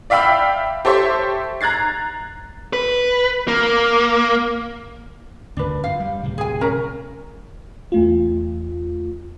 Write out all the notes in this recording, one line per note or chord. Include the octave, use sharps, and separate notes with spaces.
D5 E5 F5 G5 B5 E6
G4 A4 C5 C#5 E5
A#5 F#6 G#6 A6 C7
B4
A#3
G1 D2 D4 B4
F2 F5
G3
D1 C3
G#4 G#5
C#4 A#4 A#5
E2 A3 F4